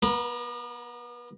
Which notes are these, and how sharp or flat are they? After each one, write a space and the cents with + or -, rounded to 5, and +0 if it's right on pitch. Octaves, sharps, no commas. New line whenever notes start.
B3 -30 A#4 +20 B5 +0